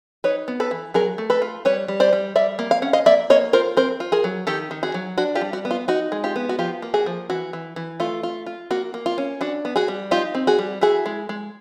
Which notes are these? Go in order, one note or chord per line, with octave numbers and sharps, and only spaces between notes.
D#4 B4 C#5
B3
A4 B4
E3
F#3 G#4 A#4
A3
A4 B4
F4
G3 B4 C#5
G3
C5 D5
G3
G3 D5 E5
A#3
F5
C#4 F#5
D#5 F5
A#3 D5 E5
A#3 C#5 D#5
F4 A#4 C5
C4 A#4 C5
F4
G#4 A#4
F#3
D#3 G4 A4
D#3
F#4 G#4
F#3
D4 F#4
F4 G4
G3
F#4
B3
F4
D#4 F#4
G#3
F4 G4
B3
F#4
F3 F4 G4
A#3
F#4 G#4
F3
E3 F#4
E3
E3
A3 F4
F4
F4
A#3 F#4
A#3
F4
C#4
D4 F#4
B3
F#4 G#4
G3
D#4 F4 G4
C4
F#4 G#4
G3
E4 F#4 G#4
G#3
G#3